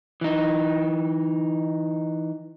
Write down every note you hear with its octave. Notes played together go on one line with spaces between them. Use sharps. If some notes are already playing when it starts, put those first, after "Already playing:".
E3 D#4